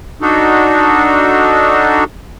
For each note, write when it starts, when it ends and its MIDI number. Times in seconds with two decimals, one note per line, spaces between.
0.22 2.04 62
0.22 2.04 63
0.22 2.04 66
0.22 2.04 69